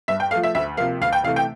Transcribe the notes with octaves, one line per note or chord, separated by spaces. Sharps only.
G2 E5
G5
F3 A3 F5
E5
D2 E5
C3 F3 A#3 F5
D2 F5
G5
C3 E3 A3 F5
G5